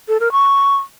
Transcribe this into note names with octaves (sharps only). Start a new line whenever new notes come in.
A4
A#4
C#6